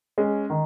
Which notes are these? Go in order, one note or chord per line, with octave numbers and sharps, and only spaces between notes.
G#3 C#4
D#3